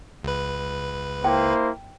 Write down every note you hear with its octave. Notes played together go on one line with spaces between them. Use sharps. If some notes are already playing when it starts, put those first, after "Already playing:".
C#2 B4
A#3 E4 C5 G5